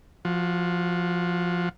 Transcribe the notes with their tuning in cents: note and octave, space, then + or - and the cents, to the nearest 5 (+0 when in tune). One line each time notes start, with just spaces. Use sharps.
F3 +0 F#4 -20